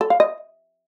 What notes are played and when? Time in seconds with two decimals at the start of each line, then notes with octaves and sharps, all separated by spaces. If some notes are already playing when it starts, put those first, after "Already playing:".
0.01 A4
0.10 F5
0.20 D#5